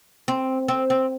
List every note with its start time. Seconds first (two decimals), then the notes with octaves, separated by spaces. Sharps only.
0.28 C4
0.68 C4
0.90 C4